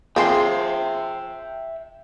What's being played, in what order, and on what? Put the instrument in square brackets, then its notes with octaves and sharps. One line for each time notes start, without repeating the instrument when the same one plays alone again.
[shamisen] F3 C4 [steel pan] F4 G#4 C6 [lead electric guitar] E5 G5